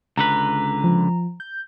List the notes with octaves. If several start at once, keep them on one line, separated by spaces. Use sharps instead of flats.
C#2 D3 B4 A#5
F3
G6